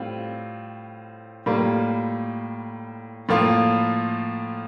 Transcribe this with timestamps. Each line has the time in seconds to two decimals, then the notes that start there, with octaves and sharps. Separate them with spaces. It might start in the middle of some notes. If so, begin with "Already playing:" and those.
Already playing: A2 G3 C4 F4
1.46 A2 G3 A#3 F4
3.29 A2 F3 A#3 F4